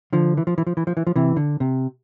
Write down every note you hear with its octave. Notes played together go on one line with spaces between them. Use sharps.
D3 F3
E3
F3
E3
F3
E3
F3
E3
F3
C3 E3
D3
C3